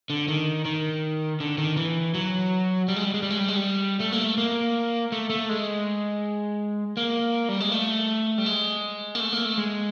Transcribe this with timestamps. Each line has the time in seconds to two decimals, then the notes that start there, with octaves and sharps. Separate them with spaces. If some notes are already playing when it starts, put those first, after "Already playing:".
0.10 D3
0.28 D#3
0.65 D#3
1.40 D3
1.58 D#3
1.77 E3
2.14 F#3
2.88 G3
2.96 G#3
3.05 G3
3.14 G#3
3.22 G3
3.30 G#3
3.39 G3
3.48 G#3
3.56 G3
4.00 A3
4.12 A#3
4.24 A3
4.38 A#3
5.12 A3
5.30 A3
5.49 G#3
6.97 A#3
7.49 G3
7.60 G#3
7.72 A3
8.38 G3
8.46 G#3
9.15 A#3
9.20 A3
9.32 A#3
9.45 A3
9.57 G#3